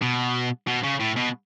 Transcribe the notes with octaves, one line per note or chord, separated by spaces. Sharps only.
B2
B2
C#3
A2
B2